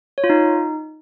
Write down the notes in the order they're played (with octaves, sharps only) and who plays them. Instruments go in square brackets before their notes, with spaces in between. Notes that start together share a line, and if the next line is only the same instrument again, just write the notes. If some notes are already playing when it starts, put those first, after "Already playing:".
[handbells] C#5
F4
D#4